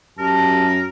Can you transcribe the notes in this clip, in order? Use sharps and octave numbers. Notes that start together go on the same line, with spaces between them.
F#2 G4 A#4 A5